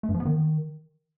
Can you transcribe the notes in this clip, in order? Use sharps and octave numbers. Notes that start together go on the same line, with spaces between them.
A3
G2
F3
B3
D#3